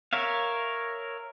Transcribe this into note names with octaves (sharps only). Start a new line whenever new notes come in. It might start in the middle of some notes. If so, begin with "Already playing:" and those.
A#4 C#5 E5 F5